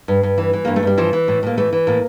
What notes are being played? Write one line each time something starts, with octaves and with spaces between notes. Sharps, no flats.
G2
G2
E3
E3
G2 A#3
A3
G2 G3
E3 F3
E3
A2
A2 A#3
E3 A3
E3
A2 A#3